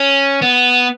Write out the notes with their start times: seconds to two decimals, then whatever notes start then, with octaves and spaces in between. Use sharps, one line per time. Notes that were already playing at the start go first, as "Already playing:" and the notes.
Already playing: C#4
0.42 B3